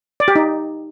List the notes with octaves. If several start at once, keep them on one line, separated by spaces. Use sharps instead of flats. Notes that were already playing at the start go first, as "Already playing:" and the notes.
D5
G4
D#4